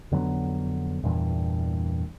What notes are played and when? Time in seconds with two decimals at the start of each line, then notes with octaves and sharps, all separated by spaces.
0.11 F2 D3 F#3 B3
1.03 E2 G2 A#2 E3